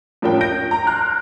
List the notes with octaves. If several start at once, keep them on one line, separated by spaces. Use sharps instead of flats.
A2 F3 C#4 D4 A#4 G5
G6 A#6 D7
A#5
A5 C6 F6 F#6